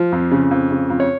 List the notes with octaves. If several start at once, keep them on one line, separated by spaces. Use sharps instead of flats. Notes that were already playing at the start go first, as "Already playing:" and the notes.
Already playing: F3
F2
C#3
F2
C#3
F2
C#5